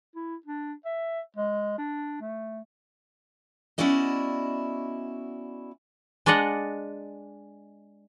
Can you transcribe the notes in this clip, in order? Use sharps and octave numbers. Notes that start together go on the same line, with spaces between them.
E4
D4
E5
G#3
D4
A3
B3 C#4 E4 F#4 D5 D#5
G#3 D4 D5 D#5 F#5